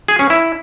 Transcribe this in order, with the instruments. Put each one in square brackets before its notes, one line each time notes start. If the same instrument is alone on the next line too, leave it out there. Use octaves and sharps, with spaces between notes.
[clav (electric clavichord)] G#4
C#4
E4